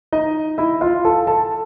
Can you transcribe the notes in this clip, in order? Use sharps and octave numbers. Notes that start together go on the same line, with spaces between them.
D#4 D#5
E4 E5
F4 F5
A4 A5
A4 A5